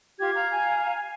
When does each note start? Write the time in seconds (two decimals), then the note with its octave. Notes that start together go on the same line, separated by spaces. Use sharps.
0.19 F4 G4 G#6
0.35 F5 A#5
0.51 G#5